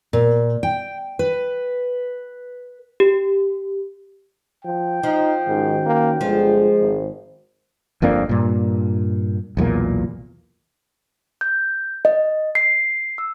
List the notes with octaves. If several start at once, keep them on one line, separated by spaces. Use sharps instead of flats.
A#2
G5
B4
G4
F3 G5
F3 D#4
G#2 D#3 C#4 F#4
A#3
G1 F3 G#3 G#4
G#1
G1 F2 A#3 D4
G2 A#2
B1 E2 A#2 A#3
G6
D#5
C7
E6